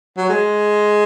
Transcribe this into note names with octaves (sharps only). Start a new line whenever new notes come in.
F#3
G#3